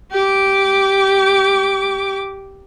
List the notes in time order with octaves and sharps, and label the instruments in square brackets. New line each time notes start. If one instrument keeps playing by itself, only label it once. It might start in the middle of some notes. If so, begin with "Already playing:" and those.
[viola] G4 D6